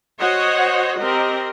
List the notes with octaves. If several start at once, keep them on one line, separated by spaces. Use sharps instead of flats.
F#4 C5 C#5 D#5 F#5
C4 G4 A#4 D#5